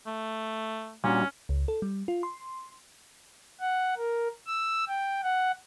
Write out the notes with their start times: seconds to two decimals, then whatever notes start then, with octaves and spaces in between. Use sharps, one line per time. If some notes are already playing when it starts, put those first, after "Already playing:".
0.06 A3
1.04 A#2 G3 C#4 D4 F#4
1.49 C#2
1.68 A4
1.82 G3
2.08 F4
2.23 C6
3.60 F#5
3.97 A#4
4.47 E6
4.88 G5
5.23 F#5